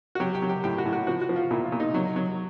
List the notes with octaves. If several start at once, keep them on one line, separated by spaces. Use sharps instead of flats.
F#4
F#3 G4
G4
F#3
G4
A2 G4
F#4
A2
F#4
F3 F#4
F#4
F3
F4
A#2 E4
F4
A#2
D#4
F#3
F#3